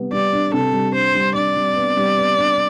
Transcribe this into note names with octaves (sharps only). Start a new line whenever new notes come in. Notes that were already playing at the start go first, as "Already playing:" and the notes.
Already playing: C3 G3 B3
G3 D5
D4
C3 A4
G3
D4 C5
G3
D4 D5
G3
B3
G3
B3
D4